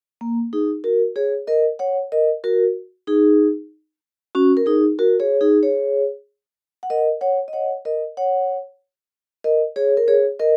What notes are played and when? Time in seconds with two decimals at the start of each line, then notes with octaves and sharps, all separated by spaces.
0.21 A#3
0.53 D#4 G#4
0.84 F#4 A#4
1.16 G#4 C#5
1.47 A#4 D#5
1.79 C#5 F#5
2.12 A#4 D#5
2.44 F#4 A#4
3.07 D#4 G#4
4.35 C#4 F#4
4.57 A#4
4.66 D#4 G#4
4.99 F#4 A#4
5.20 G#4 C#5
5.41 D#4 G#4
5.63 G#4 C#5
6.83 F#5
6.90 A#4 D#5
7.21 C#5 F#5
7.48 D#5
7.53 C#5 F#5
7.85 A#4 D#5
8.17 C#5 F#5
9.44 A#4 D#5
9.76 G#4 C#5
9.97 A#4
10.08 G#4 C#5
10.40 A#4 D#5